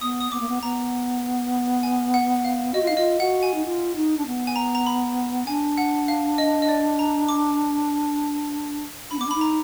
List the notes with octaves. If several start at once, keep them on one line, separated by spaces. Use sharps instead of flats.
B3 D#6
D#6
B3 D6
A#3
B3
B3 A#5
G#5
F#5
F5
F#4 D#5
F4
D#4 F5
F4 D#5
F#4 F#5
G#5
D#4
F4
D#4
D4
B3
G#5
A#5
A#5
B5
D4 G#5
F#5
F5
D#5
D#5
D5
A#5
D6
D4 B5
B3 D6
D4
D#4 B5
A#5